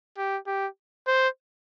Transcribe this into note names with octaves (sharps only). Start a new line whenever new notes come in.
G4
G4
C5